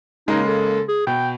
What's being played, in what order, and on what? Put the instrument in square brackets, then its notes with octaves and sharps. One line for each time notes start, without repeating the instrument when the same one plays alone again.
[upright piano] C#3 G#3 A#3 [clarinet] D#4
[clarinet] A4
G#4
[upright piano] B2 [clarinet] G5